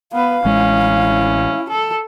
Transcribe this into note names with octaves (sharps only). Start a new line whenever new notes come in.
B3 B4 F5
A1 G#3 C#4 E4
A4